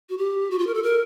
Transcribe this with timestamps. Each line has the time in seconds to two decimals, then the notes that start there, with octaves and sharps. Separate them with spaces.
0.10 F#4
0.18 G4
0.51 F#4
0.59 F4
0.67 A#4
0.74 A4
0.83 A#4